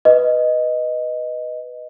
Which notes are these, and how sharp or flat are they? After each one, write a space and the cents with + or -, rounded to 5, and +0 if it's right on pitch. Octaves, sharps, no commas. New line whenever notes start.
B4 +0 D#5 +0